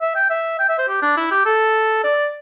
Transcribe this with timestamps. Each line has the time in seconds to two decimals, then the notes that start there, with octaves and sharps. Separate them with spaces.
0.01 E5
0.16 G5
0.30 E5
0.59 G5
0.69 E5
0.78 C5
0.88 G4
1.02 D4
1.17 E4
1.31 G4
1.45 A4
2.04 D5